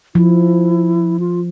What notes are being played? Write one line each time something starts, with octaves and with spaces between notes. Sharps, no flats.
F3 E4
F4